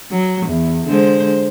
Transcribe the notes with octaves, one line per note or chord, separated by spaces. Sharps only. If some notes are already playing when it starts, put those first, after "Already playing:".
F#3
E2
D3 G#3 C5